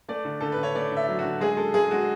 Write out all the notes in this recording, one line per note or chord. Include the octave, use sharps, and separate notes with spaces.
A3 D5
D3
D3 A4
B4
D3
C#5
A3 D5
D3
E5
F#3
F#4
D3
G#3 G#4
G#3 A4
G#3 G#4
G#3 F#4